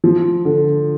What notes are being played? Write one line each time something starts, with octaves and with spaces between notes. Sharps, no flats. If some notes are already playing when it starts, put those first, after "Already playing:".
F3
D3